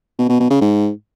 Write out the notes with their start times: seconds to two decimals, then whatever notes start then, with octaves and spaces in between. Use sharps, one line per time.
0.18 B2
0.29 B2
0.40 B2
0.50 C#3
0.61 G#2